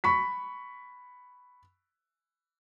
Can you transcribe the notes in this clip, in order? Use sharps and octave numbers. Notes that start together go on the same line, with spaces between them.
B5 C#6 B6